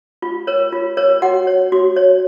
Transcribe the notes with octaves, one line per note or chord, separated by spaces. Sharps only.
F4
A#4 C#5
F4
A#4 C#5
F#4 F#5
C#5
F#4
C#5